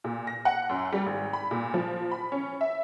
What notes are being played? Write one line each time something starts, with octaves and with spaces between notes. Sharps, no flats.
A#2
A#6
F#5
F#2
G3
G#1
B5
A#2
F3
B5
C#4
E5